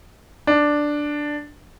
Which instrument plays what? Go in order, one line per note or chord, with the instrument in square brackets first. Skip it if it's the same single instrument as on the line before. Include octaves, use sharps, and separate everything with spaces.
[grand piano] D4